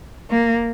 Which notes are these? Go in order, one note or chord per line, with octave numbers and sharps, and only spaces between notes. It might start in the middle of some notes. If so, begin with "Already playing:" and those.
A#3